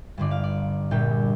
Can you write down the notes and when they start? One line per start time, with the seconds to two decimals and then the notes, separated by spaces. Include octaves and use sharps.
0.18 G1 G2 D3 D5
0.31 F5
0.44 D5
0.91 A#1 A#2 G3 G5